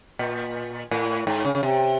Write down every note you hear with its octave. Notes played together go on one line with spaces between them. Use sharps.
A#2
A2
G#2
C#3
C#3
C3